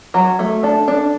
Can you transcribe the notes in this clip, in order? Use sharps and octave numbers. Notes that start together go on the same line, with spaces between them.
F#3
A3
D4 A4
D4